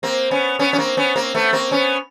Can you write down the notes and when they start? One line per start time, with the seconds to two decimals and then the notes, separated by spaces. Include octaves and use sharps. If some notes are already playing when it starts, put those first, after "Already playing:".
0.03 A#3 C4
0.31 B3 C#4
0.59 B3 C#4
0.73 C#4
0.78 A#3 C4
0.97 B3 C#4
1.16 A#3 C4
1.35 A3 B3
1.53 A#3 C4
1.71 B3 C#4